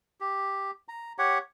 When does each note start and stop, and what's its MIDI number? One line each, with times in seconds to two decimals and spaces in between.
0.20 0.71 67
0.88 1.13 82
1.18 1.38 67
1.18 1.38 73
1.18 1.38 78